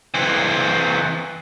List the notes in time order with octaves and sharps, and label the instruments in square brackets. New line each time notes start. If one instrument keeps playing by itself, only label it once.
[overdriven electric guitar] E3 C4